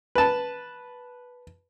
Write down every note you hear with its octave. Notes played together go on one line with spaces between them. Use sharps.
B4 A5